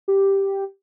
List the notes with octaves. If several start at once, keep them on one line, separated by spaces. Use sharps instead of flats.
G4